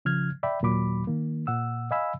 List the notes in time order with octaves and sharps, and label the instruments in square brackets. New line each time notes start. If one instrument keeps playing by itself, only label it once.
[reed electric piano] C#3 F3 F6 G#6
D5 E5 G5 B5
D#2 A#2 F#3 B5 D6
D#3 A#3
A#2 F#5 E6
D#5 F5 G#5 B5 E6